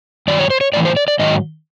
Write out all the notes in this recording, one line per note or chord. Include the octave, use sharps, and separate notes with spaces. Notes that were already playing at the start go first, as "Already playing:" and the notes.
G2 D#3 F#3 D5
C#5
C5
C#5
A2 E3 D5
C5
D5
D5
G#2 D#3 F#3 D#5